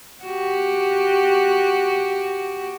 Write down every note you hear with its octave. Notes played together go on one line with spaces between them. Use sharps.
F#4 G4